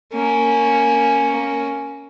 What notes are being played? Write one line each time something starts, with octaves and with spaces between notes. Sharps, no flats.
A#3 C#4